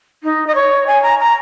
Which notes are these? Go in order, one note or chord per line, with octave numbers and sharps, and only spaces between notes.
D#4
D#5
C#5
G#5
A#5
A#5